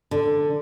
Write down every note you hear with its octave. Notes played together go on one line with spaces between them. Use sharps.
D3